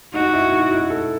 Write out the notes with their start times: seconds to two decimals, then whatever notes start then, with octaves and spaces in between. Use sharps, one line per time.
0.14 D#4 F#4
0.33 E4
0.52 D#4
0.71 E4
0.90 A4